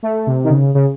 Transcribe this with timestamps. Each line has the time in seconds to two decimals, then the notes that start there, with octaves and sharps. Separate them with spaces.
0.03 A3
0.27 C3
0.44 D#3
0.50 C#3
0.75 C#3